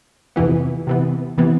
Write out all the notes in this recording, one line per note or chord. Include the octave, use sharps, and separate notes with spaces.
F2 C3 E3 B3
C3 E3 B3
C3 E3 B3